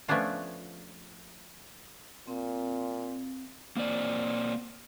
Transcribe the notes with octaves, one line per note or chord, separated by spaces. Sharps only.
F3 A3 B3 C#4 D4 F4
A#2 C4
A#3 C4 D5